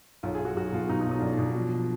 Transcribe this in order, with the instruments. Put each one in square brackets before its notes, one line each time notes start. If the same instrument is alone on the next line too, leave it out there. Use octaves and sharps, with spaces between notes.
[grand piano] B1 F4
G#4
B1
F#4
B1 F#4
B2 F4
B2 D#4
D#4
B1
D#4
B1 D4
B2 D4
F3
F3